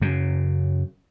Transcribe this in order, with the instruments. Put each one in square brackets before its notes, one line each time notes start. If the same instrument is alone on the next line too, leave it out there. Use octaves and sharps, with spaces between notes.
[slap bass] F#2 C#3